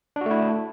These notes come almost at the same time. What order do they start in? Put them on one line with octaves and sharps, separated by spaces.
D4 F#4 A3 E4